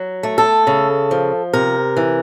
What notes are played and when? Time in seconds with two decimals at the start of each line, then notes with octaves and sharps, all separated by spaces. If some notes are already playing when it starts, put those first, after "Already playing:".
Already playing: F#3
0.23 A3
0.38 A4
0.67 C#3
1.11 F3
1.53 C3 A#4
1.97 E3